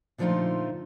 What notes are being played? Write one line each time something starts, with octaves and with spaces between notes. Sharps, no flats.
A#2 D3 F3 A3 D#4 F4